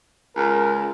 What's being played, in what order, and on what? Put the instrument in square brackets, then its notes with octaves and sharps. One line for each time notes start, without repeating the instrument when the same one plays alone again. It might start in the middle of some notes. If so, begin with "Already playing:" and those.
[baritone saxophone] C#2 [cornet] A#4